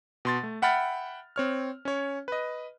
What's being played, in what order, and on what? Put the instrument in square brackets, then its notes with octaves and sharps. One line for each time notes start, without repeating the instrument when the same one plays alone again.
[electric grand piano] B2 C6 A6
A3
E5 F#5 G5 B5 F6 A6
C4 C#5 F6
C#4 C#5
B4 D#5